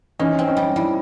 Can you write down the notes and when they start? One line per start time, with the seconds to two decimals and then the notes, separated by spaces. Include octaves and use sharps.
0.19 E3 C#4 D#4
0.39 C4
0.48 C#4 D#4
0.57 G3
0.76 G3 D4 E4